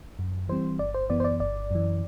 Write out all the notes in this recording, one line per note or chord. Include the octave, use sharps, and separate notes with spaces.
F#2
E3 G3 C4 C5
G1 D5
C5
F#2 E3 B3 D5
C5
D5
G1 D5
F#2 E3